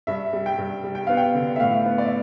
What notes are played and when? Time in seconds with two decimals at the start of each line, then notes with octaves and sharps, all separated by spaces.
0.07 G2 E5
0.33 G3
0.46 G5
0.58 G2
0.84 G3
0.95 G5
1.07 B3 F5
1.17 G5
1.35 D3
1.56 E5
1.60 A2 F5
1.85 B3
1.98 D5
2.06 E5